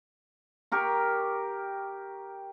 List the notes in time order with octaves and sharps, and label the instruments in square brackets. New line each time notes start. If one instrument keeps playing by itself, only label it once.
[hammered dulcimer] G4 A#4 C#6